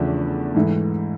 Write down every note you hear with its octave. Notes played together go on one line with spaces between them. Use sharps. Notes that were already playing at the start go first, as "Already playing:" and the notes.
Already playing: E2 C#3 F3 A3 D4
G#2 E3 A3